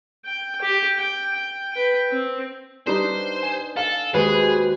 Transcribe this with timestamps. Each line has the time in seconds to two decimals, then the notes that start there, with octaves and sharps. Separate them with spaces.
0.25 G5
0.62 G4
0.98 G5
1.34 G5
1.73 B4 G5
2.11 C4
2.87 G3 D4 D#4 B4 C5
3.43 G#5
3.77 A4 F5
4.14 D#2 G#3 F#4 G#4 B4 C5 C7